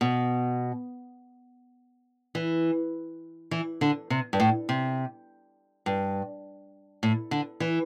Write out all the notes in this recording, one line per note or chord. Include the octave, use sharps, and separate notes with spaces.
B2
E3
E3
D3
C3
G2
A2
C3
G2
A2
D3
E3